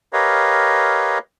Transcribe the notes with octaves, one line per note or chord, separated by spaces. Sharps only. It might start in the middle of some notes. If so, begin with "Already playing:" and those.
G4 A#4 B4 C#5 D#5 F5